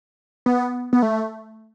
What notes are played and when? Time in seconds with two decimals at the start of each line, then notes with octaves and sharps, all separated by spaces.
0.46 B3
0.93 B3
1.02 A3